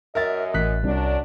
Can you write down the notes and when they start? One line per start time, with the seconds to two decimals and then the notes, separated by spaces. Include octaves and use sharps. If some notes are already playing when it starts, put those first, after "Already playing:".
0.15 F#2 A#4 D#5 E5 A6
0.54 A1 F#6 B6
0.84 C2 F#2 F#3 D4